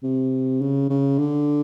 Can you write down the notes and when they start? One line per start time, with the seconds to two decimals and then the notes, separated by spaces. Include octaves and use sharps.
0.03 C3
0.61 C#3
0.90 C#3
1.18 D3